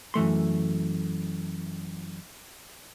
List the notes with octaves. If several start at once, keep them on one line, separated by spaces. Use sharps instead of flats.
F#2 E3 A3 C6